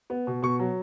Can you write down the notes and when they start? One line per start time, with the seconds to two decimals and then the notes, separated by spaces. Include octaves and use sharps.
0.10 B3
0.27 B2
0.42 B2 C#6
0.59 F#3